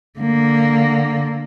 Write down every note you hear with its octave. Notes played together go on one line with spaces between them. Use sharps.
D3 A#3